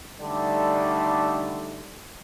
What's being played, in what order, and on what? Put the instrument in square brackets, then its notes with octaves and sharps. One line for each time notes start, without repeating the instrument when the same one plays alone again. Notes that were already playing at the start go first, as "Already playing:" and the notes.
[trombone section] D3 G3 A3 D4 D#4